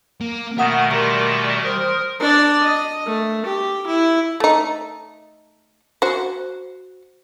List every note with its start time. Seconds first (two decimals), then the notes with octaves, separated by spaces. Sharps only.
0.21 A#3
0.58 B2 D#3 A3 A#4 F5 F#5 D#6
0.91 G3 A#4 D5 A#5 C6
1.63 A#4 C5 D#6
2.20 D4 D5
2.63 D#5
3.06 A3
3.46 G4
3.87 E4
4.40 A3 D#4
6.02 F#4 C5